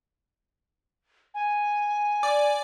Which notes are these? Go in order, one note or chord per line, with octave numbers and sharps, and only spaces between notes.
G#5
D5